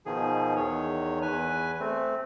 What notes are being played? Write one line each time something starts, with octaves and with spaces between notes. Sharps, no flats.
B2 D#3 F3 G#4
E2 D#3 C#5
E2 B4 G#5
A3 C4